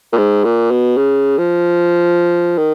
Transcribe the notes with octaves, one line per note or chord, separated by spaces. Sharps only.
A#2
G#2
A#2
B2
C#3
F3
D#3